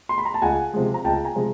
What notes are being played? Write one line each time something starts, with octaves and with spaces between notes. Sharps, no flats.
C6
B5
A#5
A5
C#2 F#5 G#5
C3 F3 G#3
A#5
C#2 G5 A5
G#5 A#5
C3 F3 G#3